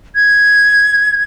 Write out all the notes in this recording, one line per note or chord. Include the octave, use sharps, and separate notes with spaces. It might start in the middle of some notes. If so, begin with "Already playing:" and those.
G#6